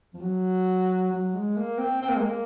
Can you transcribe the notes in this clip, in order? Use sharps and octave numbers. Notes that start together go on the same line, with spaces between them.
F3
F#3
F#3
G#3
A#3
C4
C4
A#3
G#3
A#3